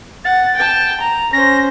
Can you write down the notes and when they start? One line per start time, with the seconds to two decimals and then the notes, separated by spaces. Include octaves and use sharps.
0.25 F#5 A6
0.56 G5 A5
1.00 A#5
1.33 C#4 C5 A#6